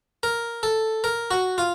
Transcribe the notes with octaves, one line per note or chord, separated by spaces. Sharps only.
A#4
A4
A#4
F#4
F4